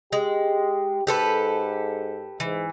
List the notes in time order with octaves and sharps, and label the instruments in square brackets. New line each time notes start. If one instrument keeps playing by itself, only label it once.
[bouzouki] G#3 [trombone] G4
[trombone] G#2 [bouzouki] G4 A4 B4
[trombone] G#2 [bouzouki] E3